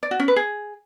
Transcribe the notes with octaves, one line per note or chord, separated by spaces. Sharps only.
D5
F#4
C#4
B4
G#4